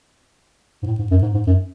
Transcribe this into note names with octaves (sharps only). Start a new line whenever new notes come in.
G#2
A2
G#2
F#2
G#2
G#2
F#2